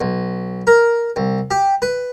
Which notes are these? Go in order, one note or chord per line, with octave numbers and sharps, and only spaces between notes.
B1
A#4
C2
G4
B4